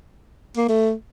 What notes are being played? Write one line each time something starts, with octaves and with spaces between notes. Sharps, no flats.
A#3
A3